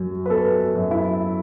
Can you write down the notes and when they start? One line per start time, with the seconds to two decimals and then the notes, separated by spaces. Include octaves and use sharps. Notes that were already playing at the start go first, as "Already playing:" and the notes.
Already playing: F#2 F#3
0.26 B4
0.30 B3 A4
0.75 F#2
0.91 E4